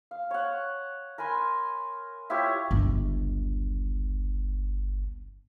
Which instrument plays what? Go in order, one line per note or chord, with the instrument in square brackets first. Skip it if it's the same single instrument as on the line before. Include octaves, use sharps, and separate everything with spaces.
[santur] F5
C#5 F#5
A#4 G#5 B5 C6
E4 F4 G4 C#5
[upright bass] G1 C#2